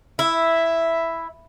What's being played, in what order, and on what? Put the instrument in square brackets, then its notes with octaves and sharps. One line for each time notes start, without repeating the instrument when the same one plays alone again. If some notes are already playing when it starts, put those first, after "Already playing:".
[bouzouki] E4 [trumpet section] E5